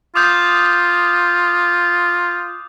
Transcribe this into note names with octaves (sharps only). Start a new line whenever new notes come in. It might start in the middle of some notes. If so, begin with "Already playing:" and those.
F4 D6 D#6 G6